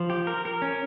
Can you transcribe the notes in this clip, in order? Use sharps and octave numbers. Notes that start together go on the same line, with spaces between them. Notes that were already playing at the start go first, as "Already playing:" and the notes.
Already playing: F3
G4
A#4
A#4
C#4